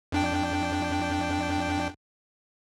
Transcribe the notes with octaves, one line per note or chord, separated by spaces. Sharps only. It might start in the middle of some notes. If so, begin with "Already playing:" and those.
F2 D4 G5